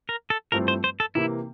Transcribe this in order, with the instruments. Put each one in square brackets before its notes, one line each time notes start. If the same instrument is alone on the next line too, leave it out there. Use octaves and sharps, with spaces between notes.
[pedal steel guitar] A#4
A4
[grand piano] G2 F3 A3 C4 E4 [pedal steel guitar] A#4
[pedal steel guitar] C5
C5
A4
[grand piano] C3 E3 A#3 [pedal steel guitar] E4